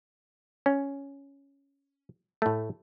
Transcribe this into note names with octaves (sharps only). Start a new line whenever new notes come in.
C#4
A2 A3